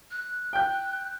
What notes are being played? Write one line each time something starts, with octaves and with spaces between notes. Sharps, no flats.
F#6
G5 G6